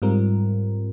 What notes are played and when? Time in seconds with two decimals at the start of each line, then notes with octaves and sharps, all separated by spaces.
0.02 G#2 G3 C4 F4 A#4